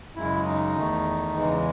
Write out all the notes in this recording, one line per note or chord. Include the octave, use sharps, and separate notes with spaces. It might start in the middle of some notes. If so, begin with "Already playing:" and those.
F#2 C#3 G#3 E4
D#4
E2 D#3 A3
E2 C#3 E3 G#3